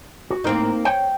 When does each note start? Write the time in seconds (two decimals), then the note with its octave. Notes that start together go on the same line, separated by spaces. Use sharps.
0.30 F#4
0.44 A2 A#3 C4 D#4 A#4
0.85 C#5 G5